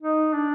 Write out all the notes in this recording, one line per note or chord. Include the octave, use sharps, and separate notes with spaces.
D#4
D4